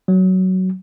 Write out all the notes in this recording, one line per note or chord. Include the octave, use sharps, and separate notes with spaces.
F#3